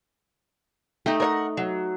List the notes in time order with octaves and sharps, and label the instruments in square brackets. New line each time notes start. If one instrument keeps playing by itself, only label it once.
[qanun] A3 D#4 [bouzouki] G4
[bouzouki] A#4 C#5 F#5
F#3